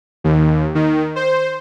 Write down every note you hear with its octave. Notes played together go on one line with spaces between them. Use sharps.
D#2
D#3
C5